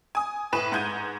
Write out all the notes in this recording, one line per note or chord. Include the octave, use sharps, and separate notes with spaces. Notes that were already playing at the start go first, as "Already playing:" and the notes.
G#5 D#6
A2 B4 E7
G#2 F#5 G6 G#6 D#7